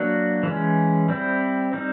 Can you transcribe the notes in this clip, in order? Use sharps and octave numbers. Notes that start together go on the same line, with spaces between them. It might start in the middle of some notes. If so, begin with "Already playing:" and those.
Already playing: F#3 A#3 D4 F#4
E3 G#3 C#4
G3 C4 E4
G3 C4 D#4